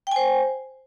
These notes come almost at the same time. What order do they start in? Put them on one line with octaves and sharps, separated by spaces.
G5 G#5 C5